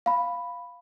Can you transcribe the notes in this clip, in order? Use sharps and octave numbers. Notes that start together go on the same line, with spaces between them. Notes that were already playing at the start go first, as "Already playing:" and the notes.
F5 B5